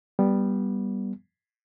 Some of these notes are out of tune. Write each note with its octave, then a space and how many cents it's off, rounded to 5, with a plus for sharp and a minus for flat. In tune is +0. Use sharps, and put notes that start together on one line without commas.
G3 +0 B3 -15